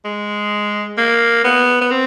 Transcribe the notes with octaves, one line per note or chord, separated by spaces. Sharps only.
G#3
A#3
B3
B3
C4